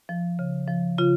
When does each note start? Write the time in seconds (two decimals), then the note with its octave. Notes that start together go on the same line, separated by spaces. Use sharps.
0.09 F3
0.39 C#3
0.68 F3
0.98 C#3 F4